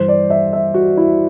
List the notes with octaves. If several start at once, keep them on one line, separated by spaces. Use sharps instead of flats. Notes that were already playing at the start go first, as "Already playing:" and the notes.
Already playing: G2 E3 C5
D5
E5
E5
F#4
E4